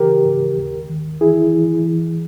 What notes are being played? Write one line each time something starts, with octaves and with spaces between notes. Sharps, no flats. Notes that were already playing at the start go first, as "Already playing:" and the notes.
Already playing: C#3 E3 G4 A#4
G#2
D#2
D#3
E3 E4 G#4
E3
E3